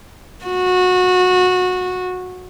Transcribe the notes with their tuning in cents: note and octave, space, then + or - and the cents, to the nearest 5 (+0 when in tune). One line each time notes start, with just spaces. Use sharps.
F#4 -20